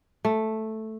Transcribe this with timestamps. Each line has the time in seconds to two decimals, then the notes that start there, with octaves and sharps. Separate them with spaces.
0.25 A3